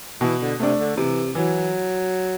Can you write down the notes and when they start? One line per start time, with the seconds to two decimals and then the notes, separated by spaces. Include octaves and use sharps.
0.21 B2 E3
0.41 D3
0.60 C3 A3 D4
0.79 D3
0.97 C3 E3
1.35 E3 F#3